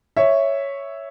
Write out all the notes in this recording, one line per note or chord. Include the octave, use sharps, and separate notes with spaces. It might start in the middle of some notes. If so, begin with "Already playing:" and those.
C#5 E5